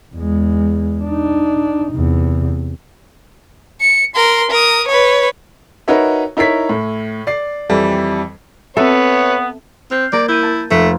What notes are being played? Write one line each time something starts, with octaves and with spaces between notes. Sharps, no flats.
E2 G#3
D4 D#4
E2 C3
C#7
A#4 C6
A#4 D#6
B4 C#5
D#4 F#4 A#4 B4 C#5 E5
D#4 E4 A#4 C#5 B6
A2
D5 C7
F2 E3 G3
B3 C4 A4 B4 C#5 E5
C4 F6 G6 C7
A#3 A#4 D5
E4 G6 D#7
A5
F1 A3